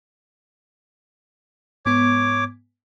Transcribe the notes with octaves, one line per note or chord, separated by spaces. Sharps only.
G#2 B3 C#5 D6